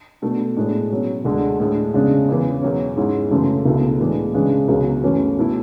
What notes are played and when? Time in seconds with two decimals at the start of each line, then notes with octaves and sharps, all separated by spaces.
0.22 B2 A3 D4
0.57 A2 G#3 D4
0.91 B2 F#3 C#4
1.25 D2 D3 G#3
1.60 A2 G#3 D4
1.94 E2 C#3 G#3 D4
2.28 E2 C#3 E3
2.62 E2 B2 F#3 C#4
2.97 G#2 G#3 C#4 E4
3.31 F#2 C#3 E3 A3
3.65 C#2 B2 A3 E4
4.00 A2 E3 G#3 D4
4.34 C#3 E3 G#3 D4
4.68 C#2 B2 F#3
5.03 F#2 E3 A3 C#4
5.37 B2 A3 E4